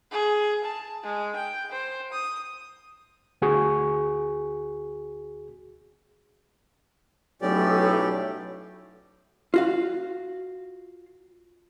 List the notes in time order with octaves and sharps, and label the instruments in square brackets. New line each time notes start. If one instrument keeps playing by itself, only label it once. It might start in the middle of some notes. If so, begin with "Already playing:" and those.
[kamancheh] G#4
A5
G#3
G5
C5
D#6
[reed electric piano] D2 F#4 G#4 C#6
[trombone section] B1 A2 [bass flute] F#3 [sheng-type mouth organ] C#4 G4 D5
[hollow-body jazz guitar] F4 F#4 F5